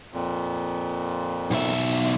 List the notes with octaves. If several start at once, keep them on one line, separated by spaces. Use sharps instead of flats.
F2 A#2
B1 E5